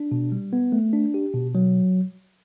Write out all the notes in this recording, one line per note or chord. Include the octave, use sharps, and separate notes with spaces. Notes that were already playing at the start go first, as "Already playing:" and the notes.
Already playing: D4
B2
G3
B3
A3
D4
G4
B2
F#3